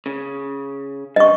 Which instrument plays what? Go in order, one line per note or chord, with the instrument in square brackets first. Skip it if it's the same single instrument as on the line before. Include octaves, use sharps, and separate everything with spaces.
[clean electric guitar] C#3
[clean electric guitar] G2 G3 [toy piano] D#5 C#6